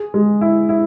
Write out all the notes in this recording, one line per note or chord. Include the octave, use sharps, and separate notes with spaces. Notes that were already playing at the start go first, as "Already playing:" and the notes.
Already playing: G#4
G#3
E4
E4